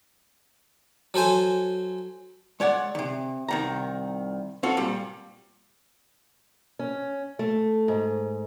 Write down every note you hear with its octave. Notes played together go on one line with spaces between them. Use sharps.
F#3 A4 C5 G#5
G#3 C#5 D5 F#5
C3 D#3
C2 D#3 A#5
C4 F4 F#4 A4
A#2 G3
C#4
A3
G#2